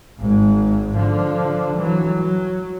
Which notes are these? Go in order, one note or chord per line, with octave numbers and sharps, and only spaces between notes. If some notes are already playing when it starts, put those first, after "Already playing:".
G#1 G#2
D3 F3
E3 F#3
F#3